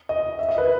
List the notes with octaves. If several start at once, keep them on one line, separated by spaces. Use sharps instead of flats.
D#5
E5
D#5
B4